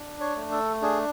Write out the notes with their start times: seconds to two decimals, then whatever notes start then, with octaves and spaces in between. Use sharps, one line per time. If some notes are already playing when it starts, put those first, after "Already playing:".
Already playing: D4
0.21 C#5
0.36 A3
0.51 A4
0.82 D4 G#4